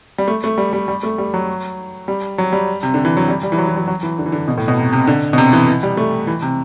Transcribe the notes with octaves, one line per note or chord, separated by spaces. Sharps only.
G3
A3
A3
G3
G3
G3
A3
G3
F#3
G3
F#3
G3
C3
D3
E3
F#3
G3
G3
E3
F#3
E3
F#3
F#3
E3
D3
E3
D3
B2
A2
B2
C3
C3
D3
B2
C3
E3
E3
G3
A3
E3
C3